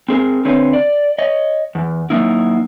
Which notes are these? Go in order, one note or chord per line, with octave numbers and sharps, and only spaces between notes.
C4 G#4 A#4
D3 C4 B4 C#5
D5
C#5 D#5
E2
F#3 A#3 D#4 E4